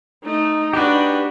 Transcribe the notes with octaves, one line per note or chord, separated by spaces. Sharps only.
A3 D#4
D4 F#4 G4 B4